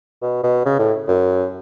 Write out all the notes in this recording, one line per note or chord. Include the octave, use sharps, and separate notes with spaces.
B2
B2
C#3
A2
F#2